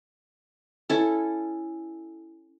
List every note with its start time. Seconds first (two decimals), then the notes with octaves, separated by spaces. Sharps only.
0.90 C#4 E4 A4